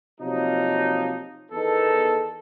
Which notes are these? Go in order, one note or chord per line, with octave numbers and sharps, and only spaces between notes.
C3 F3 F#3 A#3 D#4
E2 D#3 B3 D#4 A4